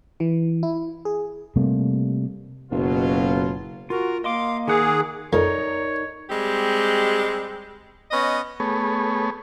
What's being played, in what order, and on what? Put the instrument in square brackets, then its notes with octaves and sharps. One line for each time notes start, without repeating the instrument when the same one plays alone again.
[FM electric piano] E3
E4
G#4
[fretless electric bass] C3 G3 A3 A#3
[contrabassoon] F#1 [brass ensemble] B2 F#3 F4
[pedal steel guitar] F4 [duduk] F#4 [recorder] A#4
[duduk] A#3 [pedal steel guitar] D#5 C6 D6 [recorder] F5
[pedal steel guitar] D#3 F#5 D6 [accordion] G#4 [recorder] A#4
[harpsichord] F2 [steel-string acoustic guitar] D#4 A#4 D5 [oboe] C#5
[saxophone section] G3 G#3 C4 G4
B3 C#4 D#5
[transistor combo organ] A3 B3 G#4 C#5